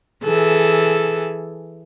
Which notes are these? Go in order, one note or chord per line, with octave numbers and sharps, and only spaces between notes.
E3 G#4 A4